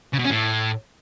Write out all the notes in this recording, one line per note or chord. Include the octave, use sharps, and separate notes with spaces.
C#3
B2
C#4
A2